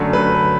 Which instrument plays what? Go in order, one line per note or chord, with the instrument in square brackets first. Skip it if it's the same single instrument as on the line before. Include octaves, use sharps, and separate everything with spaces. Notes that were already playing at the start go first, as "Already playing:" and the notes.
Already playing: [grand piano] F#2 D3 F#3 A3
B4